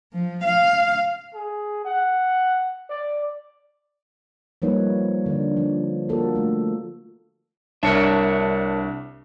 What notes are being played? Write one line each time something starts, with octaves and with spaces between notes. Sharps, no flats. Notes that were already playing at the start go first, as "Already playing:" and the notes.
F3
F5
G#4
F#5
D5
F3 G3 A#3 D#4 B4 C#5
D3 D5
F3
A#3 F4 F#4 A4 A#4
A3
C2 D4 A#4 C#5 E5 A5